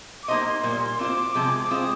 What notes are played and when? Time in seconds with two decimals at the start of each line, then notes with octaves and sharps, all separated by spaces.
0.23 D6
0.28 A#3 D#4 G4 C5 D#5 C6
0.63 A#2 G3 A#3
0.99 C4 F4 C5 D6
1.35 C3 F3 G#3 C4
1.59 D6
1.70 G#3 C4 F4 D#6